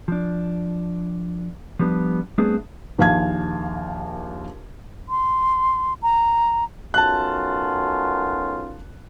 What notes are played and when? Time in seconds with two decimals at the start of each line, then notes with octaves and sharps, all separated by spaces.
0.08 F3 D4
1.79 F3 G3 B3 D4
2.38 G3 A3 B3 C4 D4 G#4
2.98 A#1 D#2 F5 A5 G#6
5.09 C6
6.02 A#5
6.94 B1 F#2 F4 A5 F#6